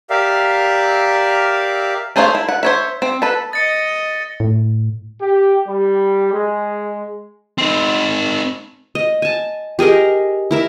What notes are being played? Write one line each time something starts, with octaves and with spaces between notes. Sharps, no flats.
G4 A#4 D5 E5 F5
A3 G#4 C5 C#5 F5
E4
F#5
C5 C#5 E5
C4
A4 B4
D#5 A6 C#7
A2
G4
G3
G#3
C4 D#4
D#5
G#5 A5
G4 G#4 A#4 D#5
E4 A#4 E5